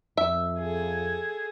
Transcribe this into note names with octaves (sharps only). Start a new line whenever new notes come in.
F2 E5
G#4 A4